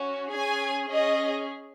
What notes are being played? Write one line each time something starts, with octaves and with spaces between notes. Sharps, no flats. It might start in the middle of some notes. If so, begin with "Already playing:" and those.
Already playing: C#4 F#4
C#4 G#4 G#5
C#4 G#4 D#5